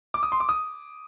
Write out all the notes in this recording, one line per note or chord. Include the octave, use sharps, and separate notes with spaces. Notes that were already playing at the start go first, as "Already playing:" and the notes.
D6
D#6
C6
D6
D#6